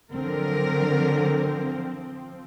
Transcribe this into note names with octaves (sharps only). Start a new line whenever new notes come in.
D3 F3 F#3 C4 A#4